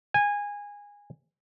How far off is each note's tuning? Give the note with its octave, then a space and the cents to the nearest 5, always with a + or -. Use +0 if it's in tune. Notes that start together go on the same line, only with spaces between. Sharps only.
G#5 -20